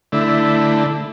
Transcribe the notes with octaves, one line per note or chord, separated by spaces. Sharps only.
D3 A3 E4